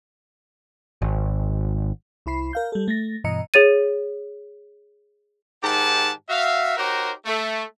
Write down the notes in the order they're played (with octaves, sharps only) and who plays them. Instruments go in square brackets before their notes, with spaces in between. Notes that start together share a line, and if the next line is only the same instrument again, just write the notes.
[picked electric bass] G#1
[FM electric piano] C2 E4 B5 C7
A#4 F5 G6
G3 A4
A3 A6 A#6
G2 B2 E3 D#5 A#5 C#7
[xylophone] G#4 C#5 A6 D#7
[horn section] G#2 D#3 G4 F#5 A5
F#4 E5 F5
D#4 F#4 G4 A#4 C5 C#5
A3